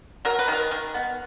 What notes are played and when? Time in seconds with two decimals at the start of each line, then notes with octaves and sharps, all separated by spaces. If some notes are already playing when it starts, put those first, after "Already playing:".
0.25 F#3 A#4
0.39 B4
0.48 D#3 A#4
0.71 D#3
0.94 B3